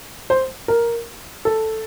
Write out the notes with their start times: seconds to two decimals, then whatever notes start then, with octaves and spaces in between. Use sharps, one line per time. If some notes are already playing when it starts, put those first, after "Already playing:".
0.30 C5
0.68 A#4
1.45 A4